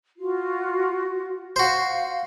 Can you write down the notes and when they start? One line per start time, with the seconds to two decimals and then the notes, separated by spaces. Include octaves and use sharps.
0.17 F4 F#4
1.56 F#4 C5 F5